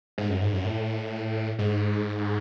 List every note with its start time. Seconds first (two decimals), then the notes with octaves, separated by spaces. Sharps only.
0.18 G#2
0.30 F#2
0.41 G#2
0.53 F#2
0.64 A2
1.59 G#2